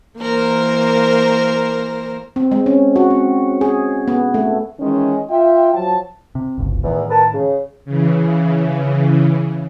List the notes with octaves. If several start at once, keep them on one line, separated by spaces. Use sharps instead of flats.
E3 A#3 A#4 C5
C4
G#3
C#4
F#4
C4
G#4
B3
A3
D#3 E3 G#3 C#4
F4 E5 G5
F3 F#3 A5
C3
D1 G1 C#2
E2 A2 D#3
A#4 B4 A5
C#3
C#3 E3